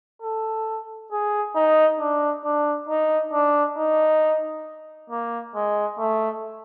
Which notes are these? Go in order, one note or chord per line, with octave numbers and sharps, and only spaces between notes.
A4
G#4
D#4
D4
D4
D#4
D4
D#4
A#3
G#3
A3